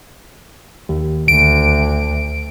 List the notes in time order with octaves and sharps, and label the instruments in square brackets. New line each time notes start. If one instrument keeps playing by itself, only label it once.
[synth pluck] D#2
[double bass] D2 [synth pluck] D7